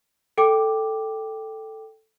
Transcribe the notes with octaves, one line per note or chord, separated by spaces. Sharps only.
A4 G5 D6